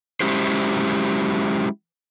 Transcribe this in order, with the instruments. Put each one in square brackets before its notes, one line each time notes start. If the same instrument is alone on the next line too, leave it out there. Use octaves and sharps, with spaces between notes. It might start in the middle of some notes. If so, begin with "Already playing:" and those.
[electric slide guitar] F#3 G#3 C#4 E4 G4 C5